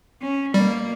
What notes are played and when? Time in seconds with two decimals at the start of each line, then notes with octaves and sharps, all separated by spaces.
0.22 C#4
0.54 B2 G3 A#3